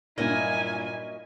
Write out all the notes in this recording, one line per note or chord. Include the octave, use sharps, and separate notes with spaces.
G2 A#2 F#3 A#3 D#4 E4 D#5 G#5